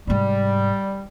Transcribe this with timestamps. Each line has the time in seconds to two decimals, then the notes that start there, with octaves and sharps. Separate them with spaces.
0.07 G#2 C3 G3